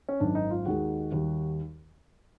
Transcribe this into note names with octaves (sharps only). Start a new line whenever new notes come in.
C#4
G#1 F#2 D#3 D4
D#4
F4
D#2 D#3 G#3 F#4
D#2 D#3 G3